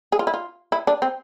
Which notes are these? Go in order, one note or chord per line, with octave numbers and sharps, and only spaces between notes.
G#4
F4
E4
F4
E4
D4
C4